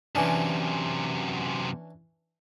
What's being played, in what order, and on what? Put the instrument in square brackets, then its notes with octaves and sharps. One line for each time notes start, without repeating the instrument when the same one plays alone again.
[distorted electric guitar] F#2 C3 [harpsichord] E3 C#4 D4